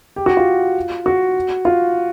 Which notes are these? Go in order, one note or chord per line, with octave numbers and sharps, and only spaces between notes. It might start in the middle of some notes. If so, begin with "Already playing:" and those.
G4
F#4
F4
F#4
F4